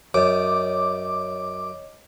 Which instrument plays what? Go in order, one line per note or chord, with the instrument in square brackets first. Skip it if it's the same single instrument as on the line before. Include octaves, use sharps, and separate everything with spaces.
[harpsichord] F#2 [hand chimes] C#5 D#5 [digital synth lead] D6